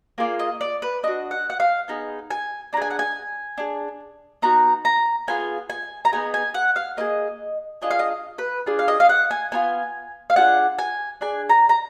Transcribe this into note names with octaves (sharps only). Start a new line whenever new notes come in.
A#3 F4 G#4 D5
D#5
D5
B4
D4 F#4 D#5
F#5
F#5
F5
B3 D#4 G#4
G#5
D4 G#4 G#5 A#5
F#5
G#5
D4 G#4
B3 D#4 F#4 A#5
A#5
B3 D4 F4 G#4 G#5
G#5
A#5
B3 D#4 G#4 G#5
G#5
F#5
F5
A#3 F4 G#4 D#5
D4 F4 G#4 D#5
F5
D#5
B4
D4 F4 G#4
F5
D#5
F5
F#5
G#5
B3 D4 F4 G#5
F5
D4 F4 G#4 F#5
G#5
D4 G#4 G#5
A#5
A#5